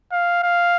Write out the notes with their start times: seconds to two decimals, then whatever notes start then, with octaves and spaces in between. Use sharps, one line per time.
0.12 F5
0.43 F5